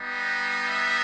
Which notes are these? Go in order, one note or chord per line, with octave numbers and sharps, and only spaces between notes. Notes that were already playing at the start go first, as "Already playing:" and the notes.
Already playing: G3 B3 D#4
E5